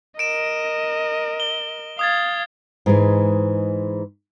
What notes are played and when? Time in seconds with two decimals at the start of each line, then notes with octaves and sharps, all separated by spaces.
0.19 A#4 D#5 D7 E7
1.40 G7
1.99 F5 D#6 G#6 A6
2.86 G#2 E3 G#3